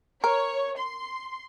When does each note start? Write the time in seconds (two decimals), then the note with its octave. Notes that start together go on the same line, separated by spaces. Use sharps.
0.24 A#4 C#5
0.78 C6